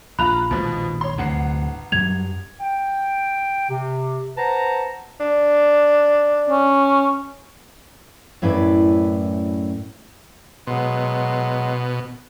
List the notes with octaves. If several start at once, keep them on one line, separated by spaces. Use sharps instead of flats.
A#1 F4 A#5 B5 F#6 F7
A#1 D#2 B2 F3 G#3
C#5 C6
G1 D2 A2 C3 F#5 C7
F#2 F#3 G3 G#6 F7
G5
C3
B4 C5 F#5 A5 A#5
D4
C#4
F#2 A2 C#4 E4 B4 D5
B2 F#3 G#3 C6